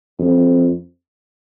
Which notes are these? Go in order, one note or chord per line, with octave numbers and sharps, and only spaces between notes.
F2